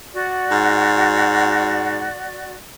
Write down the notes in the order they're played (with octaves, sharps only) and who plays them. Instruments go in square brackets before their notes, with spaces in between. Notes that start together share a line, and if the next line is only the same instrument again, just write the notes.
[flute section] F#4 D5
[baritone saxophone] G#2